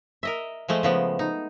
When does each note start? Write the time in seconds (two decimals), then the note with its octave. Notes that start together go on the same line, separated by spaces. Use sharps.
0.23 A#4 D#5 E5
0.69 F3 G#3 A3 D#5
0.83 C#3 F3 B3
1.19 D#4